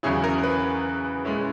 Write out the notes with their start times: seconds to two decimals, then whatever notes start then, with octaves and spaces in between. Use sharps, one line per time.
0.03 E2 C#3 F#3 C#4 E4 G#4
0.24 A#4
0.43 B4
1.25 A#2 G#3 C#4 E4